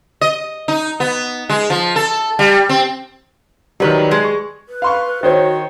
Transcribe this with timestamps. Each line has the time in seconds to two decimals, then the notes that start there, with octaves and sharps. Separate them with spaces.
0.21 D#5
0.68 D#4
1.00 B3
1.50 G#3
1.70 F3
1.96 A4
2.39 G3
2.69 C4
3.80 D#3 F#3 G3 B4
4.11 G#3
4.24 C#6
4.69 B4
4.82 F5 C6 C#6
5.23 D#3 F#4 C5 C#5